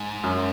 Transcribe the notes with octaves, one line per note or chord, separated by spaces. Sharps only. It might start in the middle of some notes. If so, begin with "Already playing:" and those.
Already playing: G#2
F#2